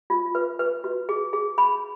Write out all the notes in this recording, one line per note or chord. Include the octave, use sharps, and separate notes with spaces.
F4
B4
B4
F#4
G#4
G#4
B5